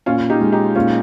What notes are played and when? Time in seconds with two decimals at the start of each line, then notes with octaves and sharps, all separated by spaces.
0.06 A#2 C#4 F4
0.30 D#4 G4
0.41 G#3
0.52 D#4 G4
0.75 A#2 C#4 F4